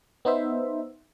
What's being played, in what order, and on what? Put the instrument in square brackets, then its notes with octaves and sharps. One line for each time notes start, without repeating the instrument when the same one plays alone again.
[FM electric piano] B3 D#4 C5 E5